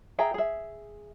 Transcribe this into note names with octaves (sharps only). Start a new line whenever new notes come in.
G#4 E5 G5 A#5
G#4 E5